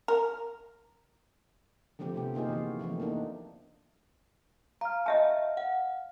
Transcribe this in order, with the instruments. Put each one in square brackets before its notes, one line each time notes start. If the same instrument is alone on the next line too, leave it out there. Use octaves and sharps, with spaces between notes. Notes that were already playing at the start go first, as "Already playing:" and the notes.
[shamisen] A#4
[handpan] D3 F3 A3 C4 G4
C3 B3 G4
A#3 D#4 F4 G#4 C5
E3 F#4
E3 F3 A3 C4
A#3 B3 D4 D#4
[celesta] F5 F6 [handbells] A#5
[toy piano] D#5 E5 A5
[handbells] F#5